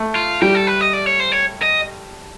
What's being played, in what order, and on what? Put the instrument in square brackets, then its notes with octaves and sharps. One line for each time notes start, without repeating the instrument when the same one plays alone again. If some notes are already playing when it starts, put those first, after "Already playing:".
Already playing: [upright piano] A3
[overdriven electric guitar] F4
[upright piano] G3 [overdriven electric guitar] G4
[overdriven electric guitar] A4
B4
D#5
D5
C#5
C5
C#5
D#5